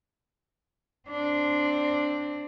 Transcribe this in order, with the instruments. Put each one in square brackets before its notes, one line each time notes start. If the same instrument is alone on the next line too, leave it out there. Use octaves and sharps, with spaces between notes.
[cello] C4 D4